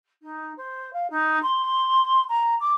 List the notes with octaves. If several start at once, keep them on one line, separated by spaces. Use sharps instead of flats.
D#4
C5
F5
D#4
C6
A#5
D6